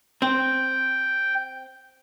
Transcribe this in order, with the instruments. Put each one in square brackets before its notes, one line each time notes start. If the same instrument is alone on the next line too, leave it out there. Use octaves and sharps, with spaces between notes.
[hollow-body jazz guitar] C4 [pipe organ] G5